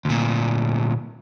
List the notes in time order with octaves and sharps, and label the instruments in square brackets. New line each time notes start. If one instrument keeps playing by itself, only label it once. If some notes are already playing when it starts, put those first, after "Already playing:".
[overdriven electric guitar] D2 A#2